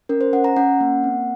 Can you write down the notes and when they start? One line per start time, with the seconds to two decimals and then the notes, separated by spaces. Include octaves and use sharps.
0.09 C#4 A#4
0.21 C5
0.33 C#4 F#5
0.44 A#5
0.56 C#4 F#5
0.81 A#3
1.04 C4